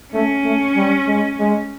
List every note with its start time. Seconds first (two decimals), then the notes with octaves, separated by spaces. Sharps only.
0.13 A3 C#4
0.44 A3
0.76 G3
1.07 G#3
1.40 G#3